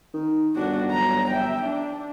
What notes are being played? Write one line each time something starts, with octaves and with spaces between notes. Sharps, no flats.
D#3
G1 D4 F#4
F#3 A#5
E5 G5
D4